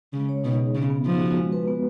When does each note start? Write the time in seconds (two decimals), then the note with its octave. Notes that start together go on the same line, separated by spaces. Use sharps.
0.13 C#3 G#3
0.29 C#5
0.44 B2 D#4
0.59 G#4
0.75 C#3 B3
0.90 B3
1.05 F3 D#4
1.21 F#4
1.36 G#3
1.52 B4
1.68 B3